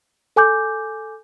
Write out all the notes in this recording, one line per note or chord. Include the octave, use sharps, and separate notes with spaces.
A4 G#5 D6 G6